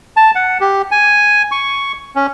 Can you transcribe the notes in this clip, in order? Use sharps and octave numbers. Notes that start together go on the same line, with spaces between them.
A5
F#5
G4
G#5
C#6
C#4